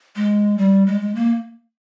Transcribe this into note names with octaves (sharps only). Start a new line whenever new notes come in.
G#3
G3
G#3
G#3
A#3